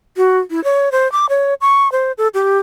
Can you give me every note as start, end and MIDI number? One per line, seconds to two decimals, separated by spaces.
0.17 0.39 66
0.50 0.63 64
0.64 0.92 73
0.92 1.10 72
1.12 1.26 86
1.29 1.54 73
1.61 1.91 85
1.92 2.12 72
2.18 2.28 69
2.34 2.58 67